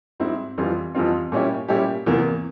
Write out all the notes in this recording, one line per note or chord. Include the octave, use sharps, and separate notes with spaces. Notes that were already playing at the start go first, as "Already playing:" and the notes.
G#2 G3 C4 E4
F2 E3 G3 C4 F4
F2 E3 G3 C4 F4
A#2 G3 C#4 E4 G4
A#2 G3 C#4 E4 G4
E2 C3 E3 A#3